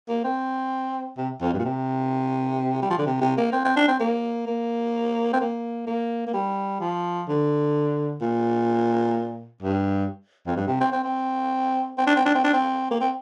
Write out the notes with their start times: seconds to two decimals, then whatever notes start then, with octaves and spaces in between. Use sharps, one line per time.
0.09 A#3
0.24 C4
1.18 C3
1.41 F2
1.54 G2
1.59 A#2
1.65 C3
2.82 G3
2.90 F3
2.98 D3
3.06 C3
3.21 C3
3.37 A#3
3.52 C4
3.65 C4
3.76 D4
3.88 C4
4.00 A#3
4.47 A#3
5.33 C4
5.41 A#3
5.87 A#3
6.27 A#3
6.34 G3
6.81 F3
7.28 D3
8.22 A#2
9.62 G2
10.47 F2
10.56 G2
10.68 C3
10.80 C4
10.92 C4
11.04 C4
11.98 C4
12.07 D4
12.16 C4
12.25 D4
12.35 C4
12.44 D4
12.53 C4
12.91 A#3
13.01 C4